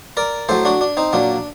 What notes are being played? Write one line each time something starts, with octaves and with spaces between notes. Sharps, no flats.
A#4 D5
A2 F#3 A4 C5
D4 F#4
D4
C4 D#4
A#2 F#3 D4